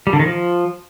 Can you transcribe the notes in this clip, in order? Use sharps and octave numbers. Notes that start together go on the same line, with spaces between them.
G3
D3
D#3
F3